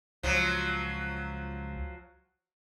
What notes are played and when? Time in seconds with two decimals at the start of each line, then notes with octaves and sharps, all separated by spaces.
0.23 C#2 F3 F#3